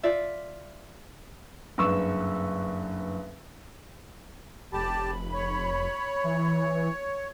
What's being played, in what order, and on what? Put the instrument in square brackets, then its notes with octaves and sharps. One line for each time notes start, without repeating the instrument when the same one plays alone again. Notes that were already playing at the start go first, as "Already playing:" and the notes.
[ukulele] F4 D5 E5
[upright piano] F#1 G2 B4 C#6 E6 E7
[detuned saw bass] F1 [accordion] G4 A5 [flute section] B5
[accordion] C#5
[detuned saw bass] E3